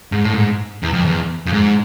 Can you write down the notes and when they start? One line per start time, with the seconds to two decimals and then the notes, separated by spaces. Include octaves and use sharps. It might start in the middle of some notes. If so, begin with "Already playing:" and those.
0.12 G#2
0.23 A2
0.33 G#2
0.83 E2
0.93 F2
1.05 E2
1.46 F2
1.53 G#2